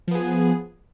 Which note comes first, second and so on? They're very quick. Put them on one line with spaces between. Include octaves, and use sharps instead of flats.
F3 B3 G#4